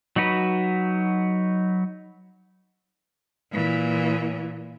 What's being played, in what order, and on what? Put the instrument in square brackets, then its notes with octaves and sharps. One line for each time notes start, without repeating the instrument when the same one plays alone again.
[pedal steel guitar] F#3 D#4 F#4 B4
[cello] A#2 E3